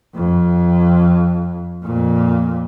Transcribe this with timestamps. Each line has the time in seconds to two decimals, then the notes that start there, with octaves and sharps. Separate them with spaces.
0.15 F2
1.83 F2 A#2